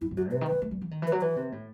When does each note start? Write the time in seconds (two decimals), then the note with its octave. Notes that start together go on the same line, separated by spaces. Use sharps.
0.01 F#2 E4
0.11 G2
0.17 F#2 F#4
0.31 C3 B4
0.41 D#3
0.47 E3 B4
0.62 A3
0.71 G3
0.81 E3
0.91 D#3
1.02 E3
1.07 B4
1.12 F#3
1.22 E3 B4
1.36 C3
1.52 A2